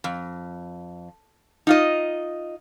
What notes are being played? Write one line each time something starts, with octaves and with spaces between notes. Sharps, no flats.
F2
D#4 F4 D#5